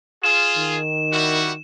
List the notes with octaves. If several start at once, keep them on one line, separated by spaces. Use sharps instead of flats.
F4 G#4 E7
D#3
G3 E4 F#4